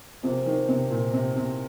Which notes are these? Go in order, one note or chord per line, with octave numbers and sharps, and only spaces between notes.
C3 F3 A#3 F4 G#4
D#3
C3
A#2
C3
C3